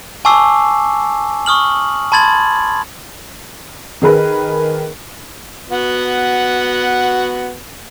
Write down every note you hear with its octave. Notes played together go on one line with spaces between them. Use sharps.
G#5 A5 C#6 D6 E6 C7
C#6 D#6 F6 F#7
A5 B5 C6 G#6 A6 F#7
D#3 G#4 A#4 B4
B3 F#4